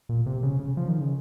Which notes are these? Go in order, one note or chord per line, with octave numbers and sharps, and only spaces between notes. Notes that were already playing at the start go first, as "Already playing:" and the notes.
A#2
C3
C#3
C#3
F3
D#3
C#3